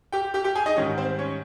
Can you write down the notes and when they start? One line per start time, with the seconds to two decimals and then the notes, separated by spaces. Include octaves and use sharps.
0.12 G4 G5
0.34 G4 G5
0.44 G4 G5
0.55 G#4 G#5
0.66 D#4 D#5
0.76 G#2 D#3 G3 C#4 C#5
0.97 C4 C5
1.19 C#4 C#5